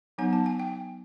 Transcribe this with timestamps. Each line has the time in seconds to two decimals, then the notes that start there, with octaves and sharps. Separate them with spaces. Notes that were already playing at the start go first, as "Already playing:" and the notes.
0.18 F#3 B3 D#4 G#5
0.33 A5
0.46 G#5
0.59 G5